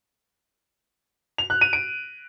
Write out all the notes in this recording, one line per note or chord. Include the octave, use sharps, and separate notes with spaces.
F7
F#6
D#7
D7